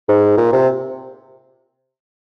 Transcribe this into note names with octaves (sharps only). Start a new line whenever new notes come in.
G#2
A#2
C3